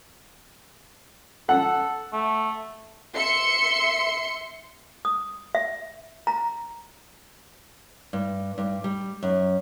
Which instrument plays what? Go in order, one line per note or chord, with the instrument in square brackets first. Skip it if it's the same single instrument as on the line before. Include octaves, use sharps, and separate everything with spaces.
[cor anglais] A4 [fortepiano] F#5
[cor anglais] A3
[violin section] E5 C6 C#7
[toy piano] D#6
E5
A#5
[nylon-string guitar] G2
G2
G3
F#2